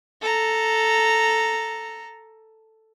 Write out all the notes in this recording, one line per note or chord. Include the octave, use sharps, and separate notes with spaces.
A4 A#5